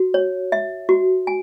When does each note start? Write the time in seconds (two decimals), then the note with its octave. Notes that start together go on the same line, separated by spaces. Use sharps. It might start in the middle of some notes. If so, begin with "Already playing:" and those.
Already playing: F#4
0.14 C#5
0.52 E5
0.89 F#4
1.27 G#5